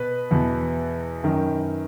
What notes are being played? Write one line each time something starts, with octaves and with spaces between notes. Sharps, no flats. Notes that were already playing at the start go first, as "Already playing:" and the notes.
Already playing: B2 B4
E2 B2
F#2 D#3